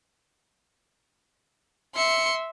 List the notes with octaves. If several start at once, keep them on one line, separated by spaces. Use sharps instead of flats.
E5 C6 C#7